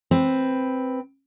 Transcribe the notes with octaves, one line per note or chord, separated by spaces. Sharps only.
C4 B4